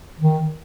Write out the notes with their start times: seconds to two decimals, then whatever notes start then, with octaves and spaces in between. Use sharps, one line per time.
0.20 D#3